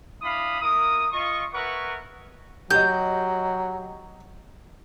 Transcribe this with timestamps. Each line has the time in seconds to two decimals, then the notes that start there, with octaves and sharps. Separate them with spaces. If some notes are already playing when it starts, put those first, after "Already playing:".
0.22 D4 E4 F5 B5 D#6
0.61 A#3 E4 A#4 D#6
1.12 F4 D#5 C#6
1.54 A#4 B4 C#5 E5 F#5 C#6
2.71 F#3 G4 D#5 G6